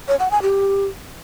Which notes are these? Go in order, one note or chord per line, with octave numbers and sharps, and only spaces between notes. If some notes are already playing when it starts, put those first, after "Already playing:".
C#5
F#5
G#5
G4